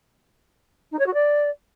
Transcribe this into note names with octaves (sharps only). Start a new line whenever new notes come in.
D#4
C#5
F#4
D5